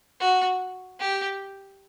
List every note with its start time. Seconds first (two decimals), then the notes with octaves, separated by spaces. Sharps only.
0.19 F#4
1.00 G4